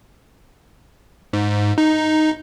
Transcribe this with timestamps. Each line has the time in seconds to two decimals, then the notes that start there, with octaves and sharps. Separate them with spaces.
1.33 G#2
1.78 D#4